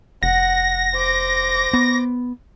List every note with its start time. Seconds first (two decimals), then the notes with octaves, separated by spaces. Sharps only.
0.23 F1 F#5 A#6
0.93 C5 D6
1.73 B3